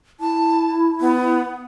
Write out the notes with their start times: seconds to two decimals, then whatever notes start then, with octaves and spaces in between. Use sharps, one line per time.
0.20 E4 A5
1.01 B3